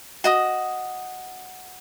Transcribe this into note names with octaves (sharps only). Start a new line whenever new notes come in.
F#4 D#5 D#6